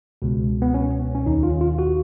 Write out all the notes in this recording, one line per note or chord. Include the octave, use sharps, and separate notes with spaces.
C#2 B2
B3
C#4
C#4
D#2 D#3 D#4
F4
F4
F#4